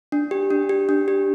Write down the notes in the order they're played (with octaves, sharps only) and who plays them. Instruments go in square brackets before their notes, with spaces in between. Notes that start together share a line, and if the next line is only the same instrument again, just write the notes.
[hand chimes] D4
G4
D4
G4
D4
G4